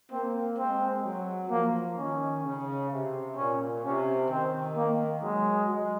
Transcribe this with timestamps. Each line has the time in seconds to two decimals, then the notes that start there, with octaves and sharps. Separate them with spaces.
0.11 A#3 C4
0.58 G#3 C4
1.05 F#3
1.51 F3 A#3
1.97 D#3 C#4
2.44 C#3
2.91 C3
3.37 A#2 C#4
3.83 C3 C#4
4.30 D#3 C4
4.76 A#3
5.23 F#3 G#3
5.69 G#3